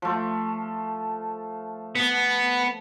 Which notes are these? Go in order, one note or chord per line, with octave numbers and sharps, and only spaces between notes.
F3 A3
B3